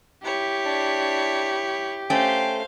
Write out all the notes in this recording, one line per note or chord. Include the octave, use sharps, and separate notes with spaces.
E4 G4 C#5
D4
A3 C#4 C5 F5 G5